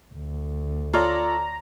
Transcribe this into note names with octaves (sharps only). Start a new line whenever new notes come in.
D2
F4 A4 C#5 D5 A#5